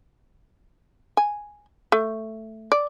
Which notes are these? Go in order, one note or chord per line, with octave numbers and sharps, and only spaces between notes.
G#5
A3
D5